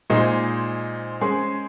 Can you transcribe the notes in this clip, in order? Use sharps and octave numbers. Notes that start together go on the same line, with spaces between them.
A#2 G#3 D#4 G#4 C5
G#3 C#4 G#4 C5